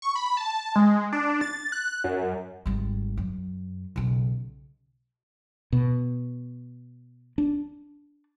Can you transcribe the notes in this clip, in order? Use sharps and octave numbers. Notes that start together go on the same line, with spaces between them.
C#6
B5
A5
G#3
D4
A6
F#6
F#2
G#1 G3
F#2
B1 C#3
B2
D4